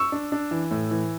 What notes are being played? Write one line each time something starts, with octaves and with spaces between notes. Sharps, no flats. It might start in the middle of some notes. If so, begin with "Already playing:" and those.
Already playing: C#6 E6
D4
D4
E3
A2
E3